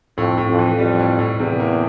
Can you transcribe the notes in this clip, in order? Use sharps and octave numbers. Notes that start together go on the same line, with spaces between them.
F2 A2
A2
F2
E3
F2 G3
A2
A2
E2 C3
A#3